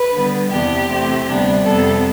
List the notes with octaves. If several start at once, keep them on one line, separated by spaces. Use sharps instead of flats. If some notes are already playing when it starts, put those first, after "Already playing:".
Already playing: B4
D3 G3 B3
E2 C3 E3 B3 D4 G4
C3 E3 A3 C4
D2 C3 G3 B3 D4
F2 C3 G3 B3 A4